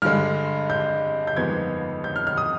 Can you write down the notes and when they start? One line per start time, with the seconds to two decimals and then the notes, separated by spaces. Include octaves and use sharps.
0.02 G2 D3 G#3 F6
0.70 G6
1.27 G6
1.37 G1 F2 D#3 G#3 B3 G#6
2.04 G6
2.16 F6
2.27 F6
2.37 D#6